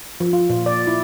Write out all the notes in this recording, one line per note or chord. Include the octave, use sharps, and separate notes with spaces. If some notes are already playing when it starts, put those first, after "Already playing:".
F3
F4
A#2
D5
E4